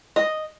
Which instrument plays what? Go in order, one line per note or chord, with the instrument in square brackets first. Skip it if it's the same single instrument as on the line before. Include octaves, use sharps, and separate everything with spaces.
[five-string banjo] D#5